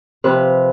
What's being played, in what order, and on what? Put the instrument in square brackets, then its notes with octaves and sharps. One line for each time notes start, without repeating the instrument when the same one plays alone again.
[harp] C3 F3 B4